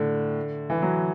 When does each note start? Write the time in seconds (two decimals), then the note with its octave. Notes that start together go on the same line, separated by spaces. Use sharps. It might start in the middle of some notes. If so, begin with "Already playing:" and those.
Already playing: A2 D3
0.70 E3
0.82 F#3